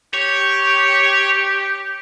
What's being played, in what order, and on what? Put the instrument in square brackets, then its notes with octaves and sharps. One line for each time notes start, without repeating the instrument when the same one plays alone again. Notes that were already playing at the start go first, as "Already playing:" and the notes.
[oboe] G4 [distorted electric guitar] C#5